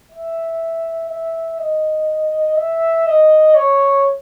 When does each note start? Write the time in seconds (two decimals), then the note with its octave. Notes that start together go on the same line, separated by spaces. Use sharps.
0.12 E5
1.10 E5
1.59 D#5
2.56 E5
3.07 D#5
3.55 C#5